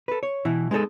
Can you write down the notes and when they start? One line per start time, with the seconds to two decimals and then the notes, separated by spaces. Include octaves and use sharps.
0.08 A4 B4
0.23 C#5
0.45 B2 E3 E4
0.71 G#3 B3 D#4 G4 A4 D#5